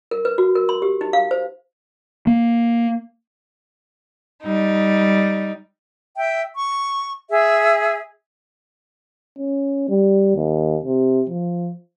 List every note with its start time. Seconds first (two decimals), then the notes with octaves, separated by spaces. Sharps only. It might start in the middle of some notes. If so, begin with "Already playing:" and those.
0.11 A#4
0.25 B4
0.38 F#4
0.55 A#4
0.69 C6
0.82 G4
1.01 D#4
1.13 F5
1.31 C5
2.27 A#3
4.43 G3 D#4
6.16 E5 G5
6.55 C#6
7.30 G#4 E5
9.39 C#4
9.89 G3
10.36 D#2
10.85 C3
11.29 F3